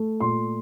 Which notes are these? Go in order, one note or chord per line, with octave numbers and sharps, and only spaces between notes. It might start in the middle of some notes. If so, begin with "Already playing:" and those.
Already playing: A3
A#2 C6